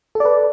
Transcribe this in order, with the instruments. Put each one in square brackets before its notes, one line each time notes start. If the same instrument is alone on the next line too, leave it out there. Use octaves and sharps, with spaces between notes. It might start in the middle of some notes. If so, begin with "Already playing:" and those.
[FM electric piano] A4
D5
B4